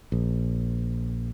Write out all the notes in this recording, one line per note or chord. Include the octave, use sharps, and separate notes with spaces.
A#1